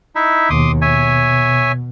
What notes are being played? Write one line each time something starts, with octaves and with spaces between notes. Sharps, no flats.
D#4 E4 E5
D#2 B2 C6 D6 D#6
B2 C#5 E5 G#5